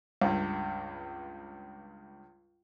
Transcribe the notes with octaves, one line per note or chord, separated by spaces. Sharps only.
C#2 G2